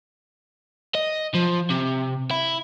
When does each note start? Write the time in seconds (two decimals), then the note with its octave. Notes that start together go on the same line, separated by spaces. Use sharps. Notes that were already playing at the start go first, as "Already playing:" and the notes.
0.95 D#5
1.34 F3
1.70 C3
2.31 E4